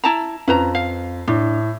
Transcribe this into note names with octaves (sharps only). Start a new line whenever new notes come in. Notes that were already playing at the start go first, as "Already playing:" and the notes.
E4 A5 A#5
F2 C#4 B4 A#5
F5
A2 D4